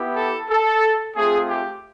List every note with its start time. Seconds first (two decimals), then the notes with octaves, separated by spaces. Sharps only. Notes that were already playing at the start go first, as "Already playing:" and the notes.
Already playing: B3 E4 G4
0.15 A4
0.49 A4
1.15 A3 C4 F4 G#4
1.47 G4